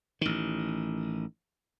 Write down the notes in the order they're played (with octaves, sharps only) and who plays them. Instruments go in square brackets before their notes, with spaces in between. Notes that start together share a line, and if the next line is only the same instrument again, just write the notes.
[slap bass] A1 D#3